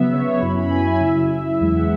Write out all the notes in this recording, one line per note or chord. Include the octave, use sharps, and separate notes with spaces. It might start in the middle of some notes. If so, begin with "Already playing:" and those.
Already playing: C#3 F#3 B3 E5
C#5
C#6
F#2 F#3 C#4 E4 B5
B5
G#5
E5
C#3 F#3 E4
E5
E2 E3 G#3 E4 E5
F#5